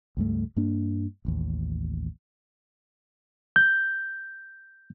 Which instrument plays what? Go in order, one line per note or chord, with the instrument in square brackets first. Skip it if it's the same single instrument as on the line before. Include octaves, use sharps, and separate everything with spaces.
[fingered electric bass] C#2 G2 A3
G2 A#3 D4
E1 A1 D#2
[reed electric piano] G6